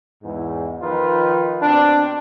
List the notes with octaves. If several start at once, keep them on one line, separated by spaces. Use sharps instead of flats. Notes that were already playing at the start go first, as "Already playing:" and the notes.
E2 G#2
D#3 F3 D#4 F4 B4
B2 C4 D4